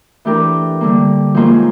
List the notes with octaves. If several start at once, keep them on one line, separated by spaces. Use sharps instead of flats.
E3 A3 D4 G4 A#4
D3 G3 A#3
G#2 F3 A#3 C#4 F4